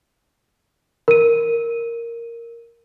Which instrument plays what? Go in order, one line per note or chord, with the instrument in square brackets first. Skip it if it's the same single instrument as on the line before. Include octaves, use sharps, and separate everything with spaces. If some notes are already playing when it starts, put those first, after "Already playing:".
[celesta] A#4 D#7